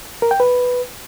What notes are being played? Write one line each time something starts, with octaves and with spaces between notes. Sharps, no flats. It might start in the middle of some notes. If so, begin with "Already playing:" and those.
A#4
G5
B4